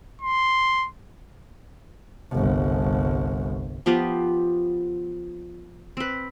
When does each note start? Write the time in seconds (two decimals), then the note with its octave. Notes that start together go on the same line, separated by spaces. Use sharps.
0.21 C6
2.32 G1 C2
3.86 F3 B3 F4 G4
5.97 C4 B4